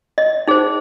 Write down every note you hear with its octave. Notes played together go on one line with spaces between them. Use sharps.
D#5
D#4 G#4 C5